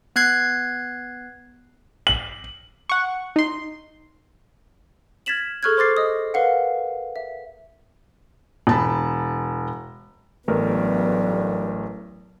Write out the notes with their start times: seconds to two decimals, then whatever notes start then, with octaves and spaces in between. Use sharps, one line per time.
0.16 B3 F#6 G#6 C7
2.07 F#7
2.89 F#5 C#6
3.36 D#4 C6
5.26 F6 G#6 A6 B6 E7 F#7
5.63 G#4 A4 C#6 F6 F#6 G#6
5.77 C5 C6 D6 A6 C7
5.97 D#5 D#6
6.34 A#4 B4 F5 F#5
7.16 E5
8.67 E1 A5 B5
10.48 A1 G2 F#3 A3 B3 A#4